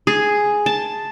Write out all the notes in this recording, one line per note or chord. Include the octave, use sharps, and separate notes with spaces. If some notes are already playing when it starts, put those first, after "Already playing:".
G#4
A5